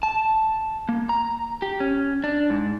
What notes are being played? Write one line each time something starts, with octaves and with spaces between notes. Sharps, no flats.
A5
A#3
A#5
G4
C#4
D4
G#2